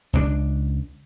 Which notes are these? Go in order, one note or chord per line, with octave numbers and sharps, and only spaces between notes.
C#2 G#3 D4